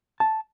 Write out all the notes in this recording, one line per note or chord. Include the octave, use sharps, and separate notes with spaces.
A5